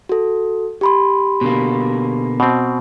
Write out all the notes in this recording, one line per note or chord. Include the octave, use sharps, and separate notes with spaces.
F#4 A4
G4 B5 C6
B2 D3 A#3
B2 C4